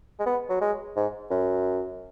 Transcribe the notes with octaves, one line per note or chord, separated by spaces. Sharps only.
G#3
B3
F#3
G#3
G#2
F#2